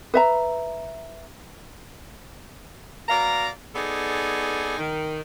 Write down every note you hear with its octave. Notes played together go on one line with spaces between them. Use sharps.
B4 E5 A#5
B2 D5 F5 A#5
B3 D#4 G#4 A4 D5 G#5
D#3